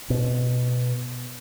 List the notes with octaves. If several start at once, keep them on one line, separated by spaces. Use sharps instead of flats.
B2